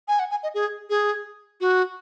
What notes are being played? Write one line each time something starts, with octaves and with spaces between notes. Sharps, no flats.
G#5
F#5
G#5
D#5
G#4
G#4
F#4